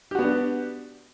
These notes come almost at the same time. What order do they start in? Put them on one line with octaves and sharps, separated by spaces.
G4 F#4 B3 D4